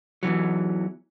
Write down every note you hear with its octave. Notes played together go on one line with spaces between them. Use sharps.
E2 A#2 E3 F#3